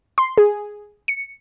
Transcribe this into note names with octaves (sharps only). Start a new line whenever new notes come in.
C6
G#4
C#7